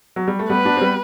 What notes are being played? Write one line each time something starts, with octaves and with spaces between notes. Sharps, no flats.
F#3
G3
A3
G3 B3 B4
B3 D4
C4
G3 B3